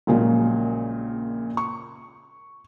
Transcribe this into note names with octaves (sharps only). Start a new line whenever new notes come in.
A#1 A#2 C#3 F#3 G#3 A#3
C#6